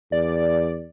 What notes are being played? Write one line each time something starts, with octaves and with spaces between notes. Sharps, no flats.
E2 D5